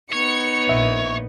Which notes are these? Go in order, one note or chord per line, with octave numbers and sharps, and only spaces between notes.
B3 D#4 C#5 C#7
A#1 E5